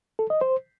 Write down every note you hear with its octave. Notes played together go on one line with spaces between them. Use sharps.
A4
D#5
C5